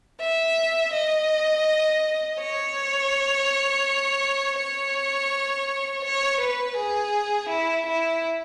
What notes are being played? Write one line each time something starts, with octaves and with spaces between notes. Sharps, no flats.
E5
D#5
C#5
C#5
C#5
B4
G#4
E4
E4